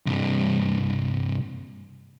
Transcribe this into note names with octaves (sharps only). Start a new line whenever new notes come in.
C2 G2